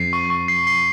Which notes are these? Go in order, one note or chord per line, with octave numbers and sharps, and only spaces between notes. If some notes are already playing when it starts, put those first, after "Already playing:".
Already playing: F2 C7
C#6
C#6
C7
C7